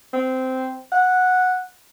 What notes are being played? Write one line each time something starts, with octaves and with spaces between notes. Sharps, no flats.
C4
F#5